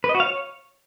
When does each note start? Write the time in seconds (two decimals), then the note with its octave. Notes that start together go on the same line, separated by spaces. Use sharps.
0.04 B4
0.09 D#5
0.15 F#4
0.20 F5
0.25 C#5